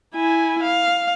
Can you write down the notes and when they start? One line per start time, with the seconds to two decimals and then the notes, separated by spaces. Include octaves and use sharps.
0.15 E4 G#5
0.63 F5